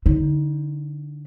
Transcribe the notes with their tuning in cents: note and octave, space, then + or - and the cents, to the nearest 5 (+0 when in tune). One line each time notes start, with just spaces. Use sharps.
D3 +0 D#4 +25